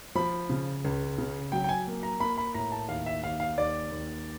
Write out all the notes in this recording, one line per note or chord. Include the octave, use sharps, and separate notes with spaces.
F3 B5
C#3
C#2
C#3
F#3 G5
G5
G#5
A#3
A#5
A#3 B5
B5
A2 A#5
A5
D#2 F5
E5
D#2 F5
F5
D#2 D5
D#2